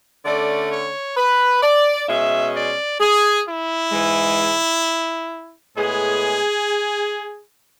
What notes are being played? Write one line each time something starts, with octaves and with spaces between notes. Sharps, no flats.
D3 A3 C#4 D5
C#5
B4
D5
B2 G#3 C#4 E5
D5
G#4
E4
G#2 E3 G#3
A2 G#3 B3 G#4